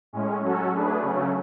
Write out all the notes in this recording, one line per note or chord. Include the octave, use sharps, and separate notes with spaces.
A2 G#3 C#4
F#3 C#4 F#4 A4
A3 D4 G#4 B4
C#3 F#3 A3 C#4